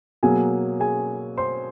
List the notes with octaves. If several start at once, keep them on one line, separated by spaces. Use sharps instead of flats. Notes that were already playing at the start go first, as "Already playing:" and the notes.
B2 F#3 A#3 G#4 G#5
G#4 G#5
C5 C6